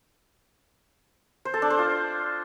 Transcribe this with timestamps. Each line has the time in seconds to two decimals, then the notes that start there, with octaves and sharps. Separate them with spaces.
1.45 C5
1.54 A4
1.62 D4
1.70 C5
1.79 F4